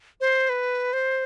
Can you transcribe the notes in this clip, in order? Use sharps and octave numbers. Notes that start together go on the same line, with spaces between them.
C5
B4
C5